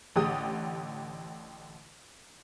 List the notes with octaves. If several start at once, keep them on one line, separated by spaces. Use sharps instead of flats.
A1 D3 G4 D#6